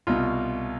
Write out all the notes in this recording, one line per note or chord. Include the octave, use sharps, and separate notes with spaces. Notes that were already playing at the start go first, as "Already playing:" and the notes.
C2 B2 F4